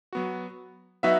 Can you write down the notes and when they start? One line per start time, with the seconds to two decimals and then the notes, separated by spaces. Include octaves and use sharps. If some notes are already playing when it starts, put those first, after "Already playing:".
0.13 F#3 B3 F#4
1.03 F#3 B3 D#4 F#4 B4 E5